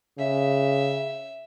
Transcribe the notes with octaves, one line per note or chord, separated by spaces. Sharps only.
C#3 E5